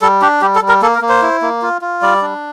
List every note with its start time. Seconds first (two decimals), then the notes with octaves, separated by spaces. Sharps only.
0.02 G3 A4
0.22 D4 G4
0.41 G3 G4
0.55 A4
0.62 G3
0.68 A#4
0.82 A#3 A4
0.95 A#4
1.02 A#3
1.09 C5
1.22 E4
1.42 A#3
1.62 F4
1.82 F4
2.02 G3 D5
2.22 D4